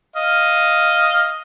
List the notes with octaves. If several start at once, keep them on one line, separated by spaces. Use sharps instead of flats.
D#5 F5